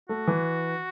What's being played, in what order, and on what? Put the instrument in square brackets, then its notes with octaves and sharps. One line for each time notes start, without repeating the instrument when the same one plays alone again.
[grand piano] A3 [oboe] F#4
[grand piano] E3